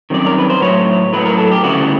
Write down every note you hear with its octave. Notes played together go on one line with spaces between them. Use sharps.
F#2 D#3 G3 C4 D5
A#4
B4
C5
A2 F#3 B3 C#5
A2 F#3 B3 B4
A#4
A4
G4
D2 C#3 E3 G3 F#4